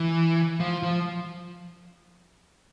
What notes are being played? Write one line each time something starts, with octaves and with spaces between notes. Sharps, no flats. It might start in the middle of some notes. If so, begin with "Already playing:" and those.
Already playing: E3
F3
F3